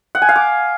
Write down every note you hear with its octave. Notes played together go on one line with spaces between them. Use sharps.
F#5
G#5
F5
D6